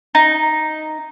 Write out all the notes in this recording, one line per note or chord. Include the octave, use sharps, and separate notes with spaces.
D#4